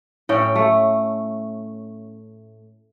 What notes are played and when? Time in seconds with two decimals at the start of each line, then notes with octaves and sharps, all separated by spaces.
0.29 A2 C#4 G5
0.55 A3